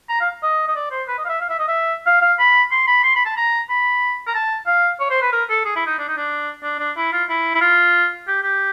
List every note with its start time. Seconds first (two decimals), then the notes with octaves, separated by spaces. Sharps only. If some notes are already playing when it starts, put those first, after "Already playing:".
0.09 A#5
0.21 F5
0.43 D#5
0.68 D#5
0.76 D5
0.91 C5
1.08 B4
1.18 D#5
1.25 F5
1.29 E5
1.41 F5
1.49 E5
1.59 D#5
1.68 E5
2.06 F5
2.21 F5
2.39 B5
2.71 C6
2.87 B5
3.04 C6
3.15 B5
3.25 A5
3.37 A#5
3.69 B5
4.27 A#5
4.34 A5
4.67 F5
5.00 C#5
5.10 C5
5.22 B4
5.32 A#4
5.50 A4
5.65 G#4
5.76 E4
5.86 D#4
5.99 D4
6.08 D#4
6.17 D4
6.63 D4
6.80 D4
6.97 E4
7.13 F4
7.29 E4
7.55 E4
7.61 F4
8.27 G4
8.43 G4